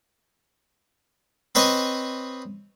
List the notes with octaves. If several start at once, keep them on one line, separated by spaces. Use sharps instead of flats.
C4 B4 C#5 D#5 G#5